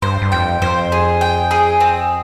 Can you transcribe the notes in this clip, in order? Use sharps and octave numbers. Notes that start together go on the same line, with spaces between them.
G2 C5
G2
F2 G5
F2 C5
G#4
G5
G#4
C4